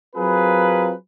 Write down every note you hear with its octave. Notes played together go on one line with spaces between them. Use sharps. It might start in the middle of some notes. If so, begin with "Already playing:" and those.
F#3 C4 F4 G#4 A#4 B4